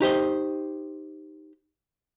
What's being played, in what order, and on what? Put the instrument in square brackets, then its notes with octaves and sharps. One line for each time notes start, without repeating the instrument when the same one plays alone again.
[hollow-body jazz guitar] D#4 G4 C5 D#5